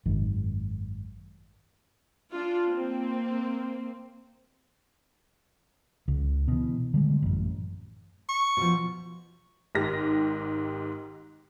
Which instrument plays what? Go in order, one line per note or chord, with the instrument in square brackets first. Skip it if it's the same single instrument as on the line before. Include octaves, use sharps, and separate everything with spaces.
[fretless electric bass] G#1 F#2 D#3
[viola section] D4 F4
A#3 C4
[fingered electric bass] C#2
B2 E3
D3 G3 G#3
A1 F#2
[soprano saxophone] C#6
[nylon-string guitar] B2 F3
[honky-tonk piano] G#1 G#2 G4 A#6